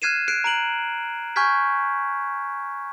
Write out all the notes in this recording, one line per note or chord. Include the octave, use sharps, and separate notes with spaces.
F6 F#6 G#6 C7 D#7 E7
F#6 C7 D7
A#5 D7 F#7
G#5 C#6 F6 G6 G#6 B6